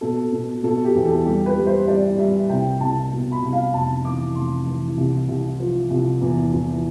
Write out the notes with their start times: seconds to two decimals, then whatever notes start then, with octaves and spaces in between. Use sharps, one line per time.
0.01 B2 A4
0.32 B2
0.63 B2 A4
0.85 G4
0.95 E2
1.05 A4
1.25 G3 G4
1.46 B4
1.56 G3
1.67 C5
1.87 G3 D5
2.18 G3 E5
2.49 C2 G5
2.80 C2 A5
3.12 B2
3.32 B5
3.42 C2
3.53 F5
3.73 F1 A5
4.04 E3 D6
4.35 F1 C6
4.67 E3
4.97 C2
5.28 C2
5.60 F3
5.90 C2
6.21 E2
6.53 E2